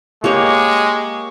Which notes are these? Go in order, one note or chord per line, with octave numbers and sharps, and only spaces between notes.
G#3 A#3 G4 C#5 C#6